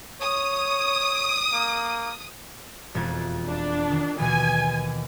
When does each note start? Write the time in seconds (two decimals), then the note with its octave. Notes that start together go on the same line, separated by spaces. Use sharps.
0.21 C#5 D#6
1.52 A#3
2.95 E1 F2 G#6
3.47 D4
3.90 D#3
4.19 D#2 B2 E3 G#5